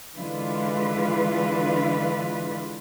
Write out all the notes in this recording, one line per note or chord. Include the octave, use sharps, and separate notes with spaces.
D3 E3 G#3 F4 B4